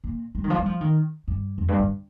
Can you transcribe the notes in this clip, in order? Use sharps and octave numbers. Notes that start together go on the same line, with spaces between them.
A#2
G3
D#3
F3
G3
F3
D#3
G2
F2
G2
G2